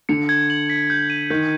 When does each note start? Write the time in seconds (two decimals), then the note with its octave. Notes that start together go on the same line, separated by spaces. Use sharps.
0.09 D3 C#7
0.29 G#6
0.50 F#7
0.70 B6
0.90 G6
1.10 D#7
1.30 D#3 G6